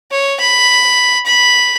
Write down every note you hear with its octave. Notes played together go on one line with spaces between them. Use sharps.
C#5
B5
B5